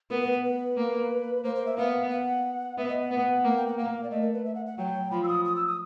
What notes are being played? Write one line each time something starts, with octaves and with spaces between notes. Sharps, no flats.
B3 A#4
B4
B4
B4
A#3
A#3 C5
C5
E5
B3 F5
F#5
B3 E5
D#5
F#5
B3
A#3
G5
F#5
A#3 F5
D5
A3 D#5
A#4
B4
E5
F#5
F#5
F#3 G5
F3 B5
E6
D#6
D#6
E6
D#6